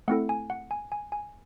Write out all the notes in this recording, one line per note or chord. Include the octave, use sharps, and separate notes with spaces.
A3 C4 E4 A4 F#5
G#5
F#5
G#5
G#5
G#5